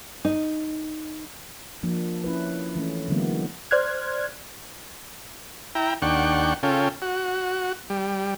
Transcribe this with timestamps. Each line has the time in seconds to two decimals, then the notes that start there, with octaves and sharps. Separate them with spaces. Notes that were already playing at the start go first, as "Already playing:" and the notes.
0.25 D#4
1.83 F3 A#3 D4
2.24 C#4 E4 B4
2.75 E3 A3 C#4
3.08 D3 E3 F#3 G#3 A#3 B3
3.71 C5 D5 C6 F6 F#6 G#6
5.75 E4 G5 A#5
6.02 D#2 D4 F#5 G5 C#6
6.63 C#3 C#4 F4 A4 G5
7.02 F#4
7.90 G3